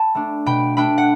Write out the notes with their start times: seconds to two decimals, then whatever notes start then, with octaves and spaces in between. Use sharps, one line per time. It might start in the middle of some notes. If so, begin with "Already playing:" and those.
Already playing: G5 A5 B5
0.15 A3 D4
0.46 B2 G5 B5
0.77 A3 D4 G5 B5
0.98 F#5